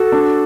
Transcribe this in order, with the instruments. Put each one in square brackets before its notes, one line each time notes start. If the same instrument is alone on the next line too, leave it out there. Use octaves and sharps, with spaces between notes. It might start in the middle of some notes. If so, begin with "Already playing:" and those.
Already playing: [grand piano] F#4 [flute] A4
[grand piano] D4